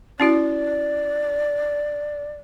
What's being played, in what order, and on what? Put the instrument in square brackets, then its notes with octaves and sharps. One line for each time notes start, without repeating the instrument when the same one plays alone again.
[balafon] C#4 E4 F#4 [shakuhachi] D5